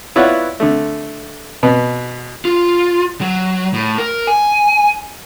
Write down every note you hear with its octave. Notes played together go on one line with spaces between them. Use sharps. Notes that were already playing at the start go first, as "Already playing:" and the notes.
B3 E4 F4 C#5 D5 F#5
D3 A3
B2 B4
F4
F#3
A2
A#4
G#5